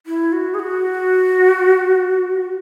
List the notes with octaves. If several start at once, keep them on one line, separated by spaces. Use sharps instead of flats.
E4
F#4
G#4
F#4